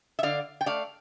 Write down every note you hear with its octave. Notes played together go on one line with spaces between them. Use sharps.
E5
D3 D5 F5
G5
A3 D5 F5